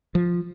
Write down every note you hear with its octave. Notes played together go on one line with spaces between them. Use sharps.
F3